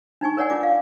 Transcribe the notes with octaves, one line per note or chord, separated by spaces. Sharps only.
D4 D#4 G#5 C#6
A#4 B4 C#5 D5 F#5 G#5
D4 F4 D6
F5